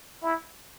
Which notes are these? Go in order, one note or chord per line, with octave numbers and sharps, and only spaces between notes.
E4